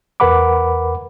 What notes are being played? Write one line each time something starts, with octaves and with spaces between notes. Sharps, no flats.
E2 A#4 B4 F#5 B5 D6